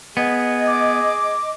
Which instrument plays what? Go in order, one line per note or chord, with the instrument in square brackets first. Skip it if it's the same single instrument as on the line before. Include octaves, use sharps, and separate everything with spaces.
[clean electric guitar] B3 [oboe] G#4 [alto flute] D#5
[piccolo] D6